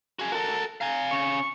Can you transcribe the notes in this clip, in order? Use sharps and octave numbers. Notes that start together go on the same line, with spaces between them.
F#4 G#4
F#4 A4 A#4
F5 G#5 A#5
C#3 C#6